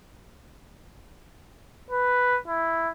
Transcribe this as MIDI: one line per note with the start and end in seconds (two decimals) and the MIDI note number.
1.90 2.37 71
2.48 2.89 64